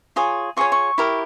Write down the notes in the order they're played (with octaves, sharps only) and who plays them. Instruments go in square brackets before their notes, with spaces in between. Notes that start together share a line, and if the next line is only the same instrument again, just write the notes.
[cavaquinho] F4 G#4 C#5
F4 G#4 C#5 C#6
C#6
E4 G4 A#4